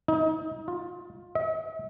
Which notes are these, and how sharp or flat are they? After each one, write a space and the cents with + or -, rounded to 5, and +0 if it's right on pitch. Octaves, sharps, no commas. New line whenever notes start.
D#4 +30
F4 +15
E5 -45